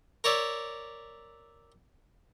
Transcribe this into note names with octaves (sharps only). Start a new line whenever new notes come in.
A#4 C#5 D5 E5